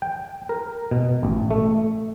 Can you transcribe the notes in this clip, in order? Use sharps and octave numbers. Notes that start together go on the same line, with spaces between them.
G5
A#4
B2
A1
A3